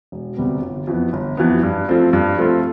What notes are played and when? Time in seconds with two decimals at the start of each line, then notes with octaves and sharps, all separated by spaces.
0.12 E1
0.37 D2 C3 G3 B3
0.62 G1
0.87 F2 E3 B3
1.13 G1
1.37 F2 E3 B3
1.63 G2
1.88 F3 A3 C4 F4
2.13 G2
2.38 F3 A3 C4 F4